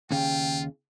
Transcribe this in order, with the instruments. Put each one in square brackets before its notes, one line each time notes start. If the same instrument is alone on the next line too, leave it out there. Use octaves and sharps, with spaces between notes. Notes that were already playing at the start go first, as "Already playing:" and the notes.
[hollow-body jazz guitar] D#2 C#3 [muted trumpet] F4 [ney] G5